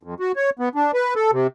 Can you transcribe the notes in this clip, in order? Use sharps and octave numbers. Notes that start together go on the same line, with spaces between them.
F2
F#4
C#5
B3
D4
B4
A4
C3